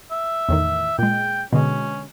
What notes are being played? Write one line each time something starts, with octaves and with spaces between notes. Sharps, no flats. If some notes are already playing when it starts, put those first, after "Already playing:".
E5
E2 A2 D#3
A#2 G#3 G5
B2 D3 G#3 C#4